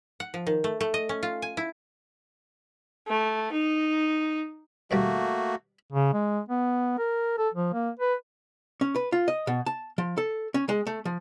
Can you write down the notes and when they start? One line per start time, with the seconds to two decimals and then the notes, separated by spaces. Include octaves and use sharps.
0.20 F#5
0.34 F3
0.47 D#3
0.64 A3
0.81 A3
0.94 D#5
1.09 C#4
1.23 F4
1.42 G#5
1.57 E4
3.08 A3
3.52 D#4
4.91 D#2 B2 G3 A3 A#3 F#4
5.92 C#3
6.13 G#3
6.49 B3
6.98 A#4
7.38 A4
7.54 F3
7.73 A#3
8.00 B4
8.81 C#4
8.96 B4
9.12 F4
9.28 D#5
9.47 B2
9.66 A5
9.98 F3
10.18 A4
10.54 C#4
10.69 G#3
10.87 A3
11.05 F3